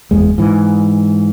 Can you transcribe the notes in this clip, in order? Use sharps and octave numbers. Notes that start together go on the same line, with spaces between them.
F#1 E2 G#3
G#2 E3